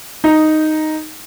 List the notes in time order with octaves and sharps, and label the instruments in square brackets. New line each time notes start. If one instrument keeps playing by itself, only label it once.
[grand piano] D#4